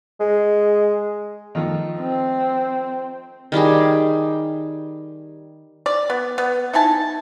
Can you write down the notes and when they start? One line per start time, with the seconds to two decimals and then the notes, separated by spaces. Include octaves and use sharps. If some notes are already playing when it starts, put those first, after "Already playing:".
0.20 G#3
1.55 D#3 F3 A3
2.00 C4
3.52 D#3 G3 G4 G#4
5.86 D5
6.10 B3
6.38 B3
6.73 D#4 E4 G#5 A5